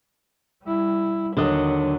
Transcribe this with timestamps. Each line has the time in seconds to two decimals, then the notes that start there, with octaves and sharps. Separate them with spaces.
0.64 G3 E4
1.37 D#2 D3 F#3 D#5